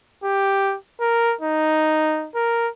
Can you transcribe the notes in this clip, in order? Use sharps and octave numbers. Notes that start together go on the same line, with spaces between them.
G4
A#4
D#4
A#4